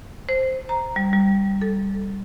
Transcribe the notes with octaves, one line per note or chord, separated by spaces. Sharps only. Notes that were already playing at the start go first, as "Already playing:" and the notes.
C5
A#5
G3
G3
A4